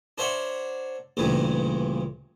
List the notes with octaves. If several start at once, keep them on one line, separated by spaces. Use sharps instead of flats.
D4 A#4 C5 C#5 E5 F#5
D2 G2 A#2 C#3 E3